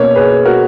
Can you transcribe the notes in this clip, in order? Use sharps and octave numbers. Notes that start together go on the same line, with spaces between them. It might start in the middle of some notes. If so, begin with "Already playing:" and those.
Already playing: B2 A#3 C#4 A#4 C#5
G#4 B4
F#4 A#4